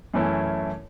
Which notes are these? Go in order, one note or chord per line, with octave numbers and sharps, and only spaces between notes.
F#2 E3 A3 C#4 E4